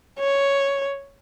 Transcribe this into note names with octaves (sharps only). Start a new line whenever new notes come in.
C#5